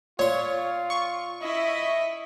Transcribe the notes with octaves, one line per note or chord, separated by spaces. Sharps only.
A#2 F4 C#5 C6
C#6
E4 D#5 E5